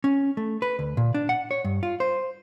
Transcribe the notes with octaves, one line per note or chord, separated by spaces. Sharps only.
C#4
A3
B4
D2
A#2
D4
F#5
C#5
G2
F4
C5